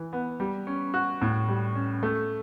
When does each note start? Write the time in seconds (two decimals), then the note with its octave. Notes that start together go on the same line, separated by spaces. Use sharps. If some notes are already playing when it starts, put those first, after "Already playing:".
Already playing: E3
0.13 B3
0.40 G3
0.67 C#4
0.94 F#4
1.22 A2
1.48 G3
1.75 C#4
2.03 A3